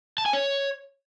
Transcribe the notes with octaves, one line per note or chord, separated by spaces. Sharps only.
A5
G#5
C#5